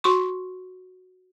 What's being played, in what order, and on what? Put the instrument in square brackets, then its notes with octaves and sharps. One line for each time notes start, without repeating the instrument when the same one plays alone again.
[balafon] F#4 C6 C#6